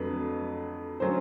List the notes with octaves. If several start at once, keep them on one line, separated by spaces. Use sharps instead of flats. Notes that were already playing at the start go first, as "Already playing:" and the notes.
Already playing: F2 D3 F#3 A3 B4
D3 F#3 A3 C#4 C5